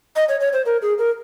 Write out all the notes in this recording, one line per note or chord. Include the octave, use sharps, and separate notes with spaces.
D#5
C#5
C#5
C5
A#4
G#4
A#4